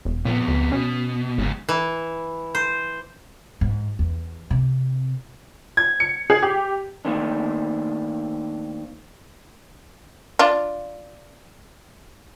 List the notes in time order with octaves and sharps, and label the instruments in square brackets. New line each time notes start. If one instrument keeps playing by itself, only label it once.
[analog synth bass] E1
[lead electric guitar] F2 B3 [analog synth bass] A#2
[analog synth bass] D2
[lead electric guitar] B2 [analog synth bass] C#4
[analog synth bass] G#1 [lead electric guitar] G#2 C#3
[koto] E3
C5
[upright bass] G#2
E2
C3
[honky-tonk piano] G#6
C#7
G#4
G4
[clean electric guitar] D#3 A3 A#3 C4 D4
[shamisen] D4 F4